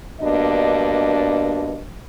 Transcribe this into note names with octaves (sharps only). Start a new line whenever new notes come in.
G2 B2 A#3 D4 D#5